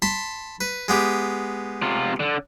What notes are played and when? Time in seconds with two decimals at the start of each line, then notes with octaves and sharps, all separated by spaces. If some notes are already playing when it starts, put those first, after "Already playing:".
0.02 A5 B5 C6
0.61 B4
0.88 G#3 B3 G4
1.82 C3 F4
2.20 D3